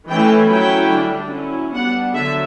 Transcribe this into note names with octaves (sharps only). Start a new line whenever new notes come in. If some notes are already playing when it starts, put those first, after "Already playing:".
E3 A3 C#4 E4 G5
F#3 C#4 E4 G5
D3 G3 D4
F#3 C#4 E4
G3 B3 D4 F#5
D3 F#3 E5